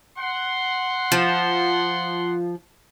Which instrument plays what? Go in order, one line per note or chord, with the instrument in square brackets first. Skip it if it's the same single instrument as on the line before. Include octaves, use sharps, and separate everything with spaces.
[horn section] F#5 C6
[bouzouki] F3